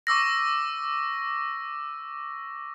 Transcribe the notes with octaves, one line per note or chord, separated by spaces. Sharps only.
C#6 D6 E6 A#6